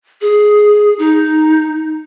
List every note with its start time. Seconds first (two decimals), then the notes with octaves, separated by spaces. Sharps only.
0.21 G#4
0.99 D#4